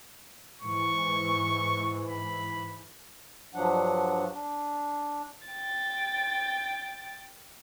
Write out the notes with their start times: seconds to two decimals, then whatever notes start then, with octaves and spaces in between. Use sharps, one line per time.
0.61 G#2 E3 C#6
2.09 B5
3.54 G2 F3 F#3 D4 F#5
4.33 D4
5.48 G5 A6